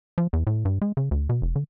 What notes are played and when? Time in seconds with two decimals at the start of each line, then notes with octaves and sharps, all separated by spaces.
0.18 F3
0.33 E2
0.47 A2
0.65 G2
0.82 G#3
0.97 C#3
1.11 D2
1.29 B2
1.42 F1
1.56 D3